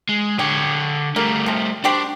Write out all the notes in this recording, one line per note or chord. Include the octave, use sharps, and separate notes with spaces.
G#3
D3 G4 C#5
G3 A3 A#3
C3 F3
D4 F#4 G4 C5